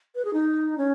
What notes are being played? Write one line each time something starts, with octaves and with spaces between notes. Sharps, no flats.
B4
G#4
D#4
C#4